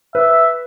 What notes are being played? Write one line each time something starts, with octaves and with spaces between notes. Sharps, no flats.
B4 E5